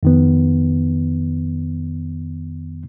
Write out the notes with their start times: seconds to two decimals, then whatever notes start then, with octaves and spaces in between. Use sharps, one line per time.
0.03 F2 D#3 B3